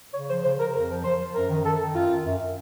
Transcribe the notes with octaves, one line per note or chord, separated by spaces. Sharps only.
C#3 C#5
F3 C5
C#3 C5
C#3 A#4
F2 A#4
F3
F3 C5
F3
F#2 A#4
D#3
D#3 A4
D#3
F#2 F4
F#2
F#2